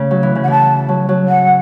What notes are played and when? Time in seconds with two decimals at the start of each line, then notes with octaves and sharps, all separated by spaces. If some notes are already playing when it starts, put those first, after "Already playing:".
Already playing: C#3 A3
0.11 F#3
0.23 E3
0.35 C#3
0.43 F#5
0.48 E3 A5
0.88 F#3
1.09 F#3
1.28 F#5